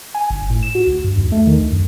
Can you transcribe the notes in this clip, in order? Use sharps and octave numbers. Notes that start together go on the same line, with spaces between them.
G#5
G1
A2
E7
F#4
D2
G2
D#2
A3
D#3
D2
F#2